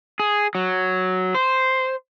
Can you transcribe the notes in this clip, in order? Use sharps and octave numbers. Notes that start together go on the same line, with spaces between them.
G#4
F#3
C5